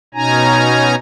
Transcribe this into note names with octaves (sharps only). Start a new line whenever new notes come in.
B2 C#4 D#4 G#5 A#5